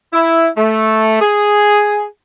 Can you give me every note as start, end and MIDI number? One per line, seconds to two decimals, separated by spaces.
0.13 0.48 64
0.57 1.21 57
1.21 2.03 68